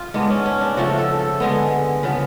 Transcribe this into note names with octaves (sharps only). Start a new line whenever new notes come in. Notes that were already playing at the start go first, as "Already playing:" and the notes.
Already playing: F4 G#4
G#2 G#3 B3 D4
C#4
C#4
D4
C#3 F3 A3 F#4
A4
A4
D3 G#3 B3
C#3 F3 B3 B4